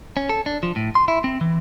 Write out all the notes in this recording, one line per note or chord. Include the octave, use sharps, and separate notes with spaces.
C#4
A4
D4
F3
A2
C6
E4
C4
E3